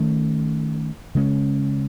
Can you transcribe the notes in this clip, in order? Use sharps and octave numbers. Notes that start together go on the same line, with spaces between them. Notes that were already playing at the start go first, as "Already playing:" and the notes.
Already playing: D#3 A3 C#4
C#3 G#3 C#4